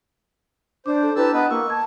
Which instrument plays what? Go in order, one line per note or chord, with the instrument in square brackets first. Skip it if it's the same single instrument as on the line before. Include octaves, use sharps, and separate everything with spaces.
[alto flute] D4 [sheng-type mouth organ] C5 [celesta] D6 G6
[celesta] A4
[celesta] D4 E4 A#5 [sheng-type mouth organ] G4 A5 E6 [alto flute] B4
[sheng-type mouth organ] B3 B4 [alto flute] D#5
[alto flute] A#3 [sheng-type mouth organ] C#6 [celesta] E6
[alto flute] A5 [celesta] G#6